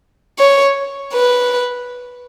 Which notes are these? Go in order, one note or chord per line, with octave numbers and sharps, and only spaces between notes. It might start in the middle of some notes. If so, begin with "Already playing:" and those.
C#5
B4